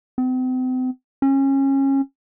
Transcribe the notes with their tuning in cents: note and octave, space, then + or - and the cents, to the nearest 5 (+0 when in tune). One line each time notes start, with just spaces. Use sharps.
C4 -40
C#4 -25